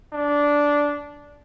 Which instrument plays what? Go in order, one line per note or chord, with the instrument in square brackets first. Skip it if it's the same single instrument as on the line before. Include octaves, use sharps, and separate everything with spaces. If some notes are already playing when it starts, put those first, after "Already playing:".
[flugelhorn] D4